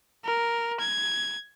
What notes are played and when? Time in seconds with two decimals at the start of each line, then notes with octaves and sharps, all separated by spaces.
0.25 A#4
0.80 G#6